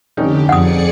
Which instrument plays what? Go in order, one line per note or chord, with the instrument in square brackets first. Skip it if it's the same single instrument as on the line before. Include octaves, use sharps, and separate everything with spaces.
[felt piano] F1 C#4 D#4 [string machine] D3 G4
[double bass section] F2 [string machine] G#4 D5 C#7 [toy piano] F#5 D#6